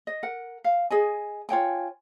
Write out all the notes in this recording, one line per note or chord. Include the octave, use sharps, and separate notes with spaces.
D#5
A#4 F#5
F5
G#4 D#5 G#5
F4 C#5 G5 G#5